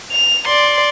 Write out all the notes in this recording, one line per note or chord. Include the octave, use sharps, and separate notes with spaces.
F7
D5 C6